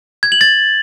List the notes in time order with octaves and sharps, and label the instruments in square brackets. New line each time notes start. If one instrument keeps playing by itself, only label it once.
[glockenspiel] G#6
F#7
A6